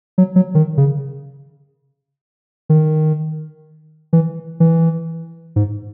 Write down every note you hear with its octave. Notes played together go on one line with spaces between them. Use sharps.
F#3
F#3
D#3
C#3
D#3
E3
E3
G#2